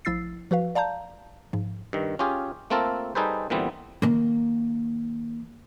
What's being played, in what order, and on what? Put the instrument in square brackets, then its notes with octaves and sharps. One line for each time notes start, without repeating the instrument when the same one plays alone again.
[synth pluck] A1 F3 E4 E6 A6 C7
F3 F#4 B4 F5
D5 F5 A5 A#5 G6
G#2 F3
[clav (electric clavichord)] G2 D#3
C#4 F4 G4 G#4
A3 A#3 C4 F4 A4 A#4
G3 D#4 G#4 A4 B4 C5
A#2 D3 E3 G3 B3 C4
[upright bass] D#3 A#3